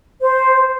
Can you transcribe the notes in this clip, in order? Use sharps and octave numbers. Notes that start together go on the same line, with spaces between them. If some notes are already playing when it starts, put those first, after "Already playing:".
C5